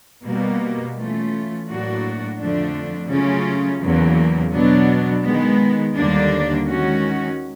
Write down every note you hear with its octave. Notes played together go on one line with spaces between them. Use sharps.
B2 G3 A#3
E3 A3 C#4 F4
A2 F#3 A#3 D4 F#4
F2 D3 F3 A3 D4
C#3 F#3 A3 C#4 F4
E2 C#3 F#3 A#3
B2 F#3 B3 D4
D#3 G#3 B3
D#2 D3 G3 A#3 D4
D#3 G#3 C#4 F#4